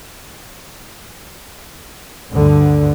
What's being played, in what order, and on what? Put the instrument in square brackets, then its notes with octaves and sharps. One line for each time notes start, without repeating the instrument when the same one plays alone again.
[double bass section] D2 G2 D3